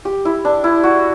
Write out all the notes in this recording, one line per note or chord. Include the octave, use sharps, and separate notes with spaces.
G4
E4
D4
E4
F#4